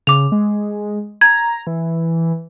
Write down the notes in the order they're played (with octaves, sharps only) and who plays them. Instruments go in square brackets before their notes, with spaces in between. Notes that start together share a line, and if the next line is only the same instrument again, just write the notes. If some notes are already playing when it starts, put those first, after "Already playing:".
[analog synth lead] C#3 [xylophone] D6 F7
[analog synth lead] G#3
[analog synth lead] A#5 [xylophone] G#6
[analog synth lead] E3